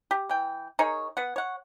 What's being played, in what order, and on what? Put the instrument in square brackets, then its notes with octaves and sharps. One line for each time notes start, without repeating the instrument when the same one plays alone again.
[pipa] G4
E3 G5
D#4 G#4 A#4 C#5
B3 F#5
C#5 F#5